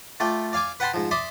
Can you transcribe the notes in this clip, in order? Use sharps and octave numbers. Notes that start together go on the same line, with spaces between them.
A3 F4 D5 G5
D5 F5 G#5 D6
B4 F#5 G5 A5 B5 C6
G#2 F3
D5 E5 C6 D6 D#6